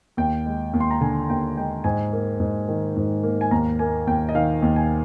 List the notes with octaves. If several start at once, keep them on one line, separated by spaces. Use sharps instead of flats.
D#2 G5
G#3
D#2
C6
A#5
D3 G#5
D#2 G5
G#3 G5
G#2 G#5
A#3
G#2
D#3
G#2
A#3
G#5
D#2 A#5
A#3 G#5
D#2 G5
D#5
D#3 F5
D#2
G#5